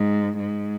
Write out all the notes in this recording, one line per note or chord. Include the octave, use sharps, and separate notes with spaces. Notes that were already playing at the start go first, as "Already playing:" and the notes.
Already playing: G#2
G#2